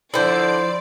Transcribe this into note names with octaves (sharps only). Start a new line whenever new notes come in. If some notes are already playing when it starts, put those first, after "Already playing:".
D3 F3 E4 C5 D5